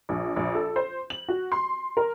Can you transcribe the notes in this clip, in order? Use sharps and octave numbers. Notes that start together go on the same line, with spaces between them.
A#1
A#1
A4
C5
F#7
F#4
C6
A#4